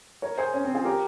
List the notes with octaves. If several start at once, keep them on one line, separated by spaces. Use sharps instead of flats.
A#4 C#5
G#4 C5
C#4
C4
F4 G#4
G4 A#4